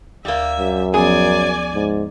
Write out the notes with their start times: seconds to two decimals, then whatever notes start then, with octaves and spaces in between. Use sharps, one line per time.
0.25 D2 G3 A#3 E5
0.59 F#2
0.94 F3 B3 C#4 G#4 D5 G#5
1.74 G#2